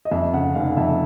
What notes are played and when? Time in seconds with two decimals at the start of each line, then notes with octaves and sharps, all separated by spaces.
0.05 D#5
0.11 F2 E5
0.33 C#3 F#5
0.55 F1 F5
0.77 F2 E5